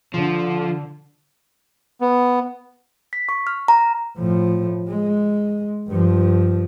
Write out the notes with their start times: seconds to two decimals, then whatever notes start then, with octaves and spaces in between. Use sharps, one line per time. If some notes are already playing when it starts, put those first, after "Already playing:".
0.14 D3 F3
2.01 B3
3.13 B6
3.29 C#6
3.47 F6
3.68 A#5
4.17 A2 F3
4.89 G#3
5.88 G2 F3